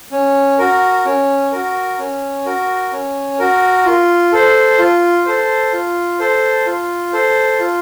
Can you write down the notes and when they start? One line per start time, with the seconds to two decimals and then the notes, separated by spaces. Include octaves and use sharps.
0.12 C#4
0.59 F#4 A#4
1.05 C#4
1.52 F#4 A#4
1.99 C#4
2.46 F#4 A#4
2.92 C#4
3.39 F#4 A#4
3.85 F4
4.32 A4 C5
4.79 F4
5.26 A4 C5
5.73 F4
6.19 A4 C5
6.66 F4
7.13 A4 C5
7.60 F4